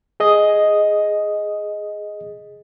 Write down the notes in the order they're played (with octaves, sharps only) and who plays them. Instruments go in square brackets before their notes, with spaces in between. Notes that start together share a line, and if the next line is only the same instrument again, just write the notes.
[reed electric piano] G#4 D#5 D#6